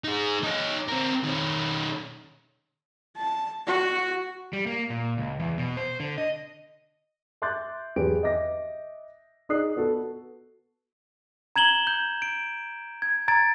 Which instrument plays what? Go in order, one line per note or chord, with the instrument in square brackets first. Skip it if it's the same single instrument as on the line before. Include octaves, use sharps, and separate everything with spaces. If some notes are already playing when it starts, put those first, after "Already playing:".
[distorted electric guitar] D#4 G#4
D#4 C#5
C4 A#4
D#3 C#4
[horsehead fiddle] A5
F#4
[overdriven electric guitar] G3
A#3
A#2
C#2
E2
B2
C5
D3
D#5
[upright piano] E5 C6 D6 F#6 G6 A6
E2 F#3 G4 G#4 B4 D7
D#5 E5 D6 A#6
D#4 G#4 D5 D#6 F#6 C7
B3 F#4 A4
[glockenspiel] A#5 G#6 E7 F#7 G7
G6
D7
G#6
A#5 G#6 A6 D7